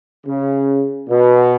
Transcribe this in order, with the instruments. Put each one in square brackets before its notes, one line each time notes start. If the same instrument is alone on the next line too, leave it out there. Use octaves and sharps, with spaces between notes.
[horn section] C#3
B2